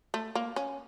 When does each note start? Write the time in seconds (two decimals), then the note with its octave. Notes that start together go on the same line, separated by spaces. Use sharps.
0.14 A3
0.35 A#3
0.56 C#4